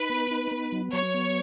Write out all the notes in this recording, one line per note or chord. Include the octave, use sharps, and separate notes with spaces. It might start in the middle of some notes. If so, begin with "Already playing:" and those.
Already playing: D#4 B4
B3
D#4
B3
F#3
F#3 C#5
B3